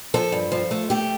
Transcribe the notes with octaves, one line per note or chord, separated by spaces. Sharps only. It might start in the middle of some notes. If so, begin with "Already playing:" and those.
F3 A4
G2
F3
A3
A3 G4